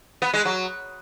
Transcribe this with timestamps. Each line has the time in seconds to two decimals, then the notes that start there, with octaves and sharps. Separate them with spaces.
0.22 B3
0.34 G#3
0.45 F#3